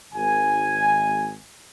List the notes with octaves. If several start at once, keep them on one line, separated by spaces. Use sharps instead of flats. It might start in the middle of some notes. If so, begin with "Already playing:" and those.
G#1 G#5